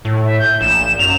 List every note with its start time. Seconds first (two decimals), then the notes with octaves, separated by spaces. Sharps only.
0.05 A2
0.25 E5
0.39 G6
0.61 A#1 E7
0.99 F#2 F7